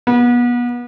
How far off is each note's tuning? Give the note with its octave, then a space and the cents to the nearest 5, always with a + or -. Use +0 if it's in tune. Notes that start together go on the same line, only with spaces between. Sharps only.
B3 -30